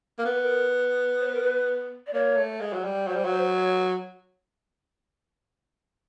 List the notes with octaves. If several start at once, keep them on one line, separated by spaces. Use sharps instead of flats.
A#3
B3 A#4
B4
A#4
C5
B4
A#4
B4
D5
A#3 C#5
A3
G#3
F#3
G3
F#3 C5
G3
F#3
C5
C#5